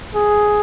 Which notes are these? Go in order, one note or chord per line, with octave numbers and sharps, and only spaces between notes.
G#4